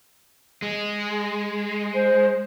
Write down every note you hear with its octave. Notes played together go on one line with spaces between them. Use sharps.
G#3
C5